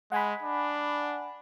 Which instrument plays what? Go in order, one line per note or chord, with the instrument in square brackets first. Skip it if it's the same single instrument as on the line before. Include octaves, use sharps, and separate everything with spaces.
[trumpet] G#3 [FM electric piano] F#5 G#5 B5
[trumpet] D4